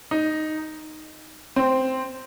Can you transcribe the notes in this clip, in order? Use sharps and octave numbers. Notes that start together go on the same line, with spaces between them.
D#4
C4